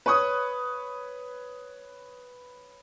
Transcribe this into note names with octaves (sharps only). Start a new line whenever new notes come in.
B4 C#5 C#6 D#6